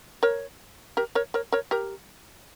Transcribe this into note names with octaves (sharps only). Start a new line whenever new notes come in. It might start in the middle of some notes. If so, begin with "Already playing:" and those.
A#4 C#5
G4 A#4
A#4 C#5
A#4 C#5
A#4 C#5
G4 A#4